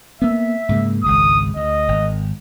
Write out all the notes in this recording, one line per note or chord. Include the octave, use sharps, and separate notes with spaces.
A#3 B3 E5
G#2 C#3 A#3
G#1 C#2 G#2 D#6
D2 D#5
G#1